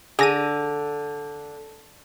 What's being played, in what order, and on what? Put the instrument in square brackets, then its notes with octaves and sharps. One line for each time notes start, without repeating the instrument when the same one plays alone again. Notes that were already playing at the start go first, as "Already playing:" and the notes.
[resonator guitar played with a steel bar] D3 [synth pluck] G#4 A#6 D#7